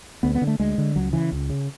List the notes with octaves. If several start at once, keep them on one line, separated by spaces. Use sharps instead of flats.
D2 B3
B3
D3
A3
D2 G#3
D3
C#2 F#3
C#3 E3
C#2
C#3